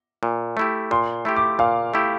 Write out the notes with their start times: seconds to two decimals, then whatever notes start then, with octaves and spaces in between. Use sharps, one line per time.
0.23 A#2
0.57 A3 E4 G4
0.91 A#2 C6
1.25 A3 E4 G4
1.36 D6
1.59 A#2 F5
1.94 A3 E4 G4